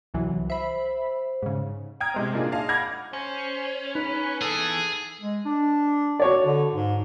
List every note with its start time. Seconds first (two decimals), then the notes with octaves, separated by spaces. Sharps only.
0.14 C2 E3 F#3
0.50 C5 E5 B5
1.42 G#2 C#3
2.00 G5 A#5 D#6 F6 G#6
2.14 C3 G#3 C4
2.33 A#3 D4 D#4 F4 G#4
2.52 G#4 D#5 F5 A5
2.69 F#5 B5 D6 F6 G#6 A#6
3.13 C#4 C5
3.95 D#4 B4
4.41 E3 B3 G#4 A4
5.21 G#3
5.45 D4
6.20 F#4 C#5 D5
6.46 D3
6.74 G#2